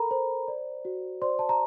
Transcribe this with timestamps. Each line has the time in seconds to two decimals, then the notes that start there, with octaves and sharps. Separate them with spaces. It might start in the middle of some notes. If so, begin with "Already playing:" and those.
Already playing: A4 A#4 A#5 B5
0.11 C5
0.48 D5
0.85 F#4
1.22 C5 D5 C6
1.39 A5
1.49 A#5